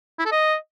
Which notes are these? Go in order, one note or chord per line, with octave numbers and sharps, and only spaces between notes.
E4
A4
D#5